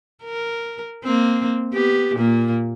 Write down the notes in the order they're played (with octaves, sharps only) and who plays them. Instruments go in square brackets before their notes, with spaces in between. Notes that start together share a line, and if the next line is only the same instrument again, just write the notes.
[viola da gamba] A#4
A#3 C4
B3 G4
A#2 A#3